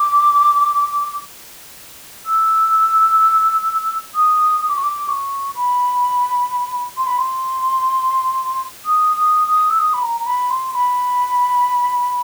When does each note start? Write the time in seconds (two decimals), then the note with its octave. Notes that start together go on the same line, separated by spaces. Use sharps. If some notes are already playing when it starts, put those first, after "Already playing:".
Already playing: D6
2.26 E6
4.15 D#6
4.61 D#6
4.69 D6
4.76 C#6
4.83 D6
5.09 C#6
5.56 B5
6.97 C6
7.07 B5
7.18 C6
8.85 D#6
9.16 D#6
9.48 D#6
9.70 E6
9.79 D#6
9.94 B5
10.03 A#5
10.21 A#5
10.26 B5
10.50 C6
10.74 B5